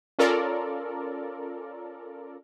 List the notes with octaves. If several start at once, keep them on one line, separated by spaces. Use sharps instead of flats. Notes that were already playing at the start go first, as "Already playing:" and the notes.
C#4 F4 A4 A#4 D5